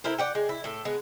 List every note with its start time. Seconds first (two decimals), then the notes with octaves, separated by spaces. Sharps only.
0.04 E4 A4 A#4 C5
0.18 D5 F#5 G5
0.35 G#3
0.49 E4
0.64 A2 A4
0.85 G#3 B3